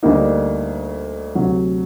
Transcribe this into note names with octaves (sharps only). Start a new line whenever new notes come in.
D2 D3 G3 A#3 D#4
D2 C3 F#3